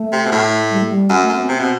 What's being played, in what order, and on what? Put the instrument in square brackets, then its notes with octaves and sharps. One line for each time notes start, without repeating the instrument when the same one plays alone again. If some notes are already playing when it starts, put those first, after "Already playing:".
Already playing: [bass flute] A3
[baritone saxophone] C3
B2
A2
[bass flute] G3
A3
G3
[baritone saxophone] F#2
[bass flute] A3
[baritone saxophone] F#2
[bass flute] C4
B3
[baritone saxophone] C3 [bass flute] C4
[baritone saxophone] B2